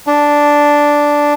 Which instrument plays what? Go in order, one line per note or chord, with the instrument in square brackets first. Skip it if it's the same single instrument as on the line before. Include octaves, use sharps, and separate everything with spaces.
[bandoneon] D4